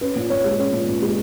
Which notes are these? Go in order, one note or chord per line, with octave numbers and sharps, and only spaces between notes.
C#4 B4
A#2
A#2 C#5
G#3
C#4 C#5
A#2
A#2
G#3